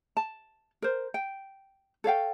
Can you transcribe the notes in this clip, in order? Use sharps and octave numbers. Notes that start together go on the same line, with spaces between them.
A5
A#4 C5
G5
A4 C#5 F5 G5